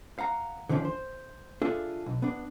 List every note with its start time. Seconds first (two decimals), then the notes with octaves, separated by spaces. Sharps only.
0.19 F5 F#5 A#5
0.69 D3 D#3 F3 G#3 C#4 D4
0.85 C5
1.62 D4 F4 G#4 A4 E5
2.06 B1
2.22 B3 D4